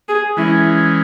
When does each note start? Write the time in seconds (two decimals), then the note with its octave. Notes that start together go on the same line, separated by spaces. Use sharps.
0.09 G#4
0.37 E3 G#3 C#4 E4